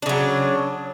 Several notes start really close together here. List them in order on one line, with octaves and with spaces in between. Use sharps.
D4 C#3 F#3